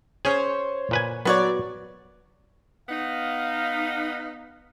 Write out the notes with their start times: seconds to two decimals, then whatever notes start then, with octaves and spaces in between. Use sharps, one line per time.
0.25 C#4 G#4 C5 C#5
0.91 A#2 B4 G#5
1.25 F#3 B3 F#4 C#5 D5
2.89 B3 D#4 F5